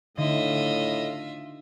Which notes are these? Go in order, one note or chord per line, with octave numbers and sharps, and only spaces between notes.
A2 D3 D#4 F4 D#5 E5